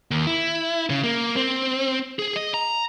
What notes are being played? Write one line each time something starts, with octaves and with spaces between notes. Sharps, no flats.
D#2
E4
C#3
A#3
C4
G#4
D#5
A#5